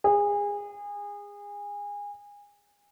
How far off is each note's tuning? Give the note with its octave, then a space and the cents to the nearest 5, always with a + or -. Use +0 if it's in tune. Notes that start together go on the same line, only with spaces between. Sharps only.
G#4 -25